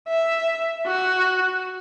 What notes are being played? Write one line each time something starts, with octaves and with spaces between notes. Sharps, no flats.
E5
F#4